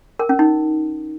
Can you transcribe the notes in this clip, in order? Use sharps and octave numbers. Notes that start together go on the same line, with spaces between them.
A#4
C#4
D#4